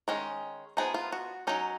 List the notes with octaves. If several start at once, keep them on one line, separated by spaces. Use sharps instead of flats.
D#3 G#3 C#4
F3 B3 D#4 G#4
F4
F#4
F#3 C#4 D#4